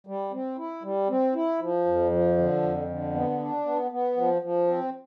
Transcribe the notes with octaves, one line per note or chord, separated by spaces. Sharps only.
G3
C4
E4
G3
C4
E4
F3
F2
F3
D3
F2
D3
B3
D4
B3
B3
F3
F3
C4